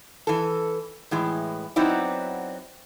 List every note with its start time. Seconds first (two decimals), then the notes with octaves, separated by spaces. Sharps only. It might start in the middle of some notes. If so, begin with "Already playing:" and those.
0.27 E3 A4
1.11 A2 E3 G#3
1.76 F#3 B3 C4 D#4 E4 D5